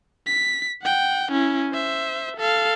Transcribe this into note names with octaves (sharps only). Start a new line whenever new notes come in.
B6
F#5 G5
C#4 E4
C5 E5
A4 F5